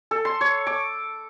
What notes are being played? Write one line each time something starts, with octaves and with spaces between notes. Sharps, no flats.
A4
C6
C#5
D6